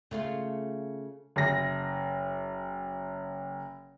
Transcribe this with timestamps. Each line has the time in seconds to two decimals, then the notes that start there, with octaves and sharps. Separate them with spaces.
0.11 C#3 A3 F4
1.36 F#1 A#6